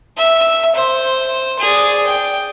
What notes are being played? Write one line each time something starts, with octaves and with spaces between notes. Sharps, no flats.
E5
C5
G#4 D5
G5